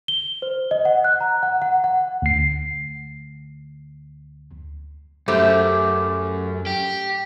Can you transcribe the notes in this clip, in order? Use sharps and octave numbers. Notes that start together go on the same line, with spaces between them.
G7
C5
D#5
F#5
F#6
A#5
F#5
F#5
F#5
D2 C7
F#2 A3 G4 C5
G4